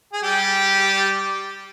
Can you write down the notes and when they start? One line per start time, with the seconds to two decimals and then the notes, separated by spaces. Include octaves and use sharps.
0.13 G#4
0.23 G3 G4